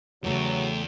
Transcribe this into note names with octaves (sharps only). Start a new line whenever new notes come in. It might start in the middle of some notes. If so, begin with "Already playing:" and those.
E2 C#3 F#3 A3 G4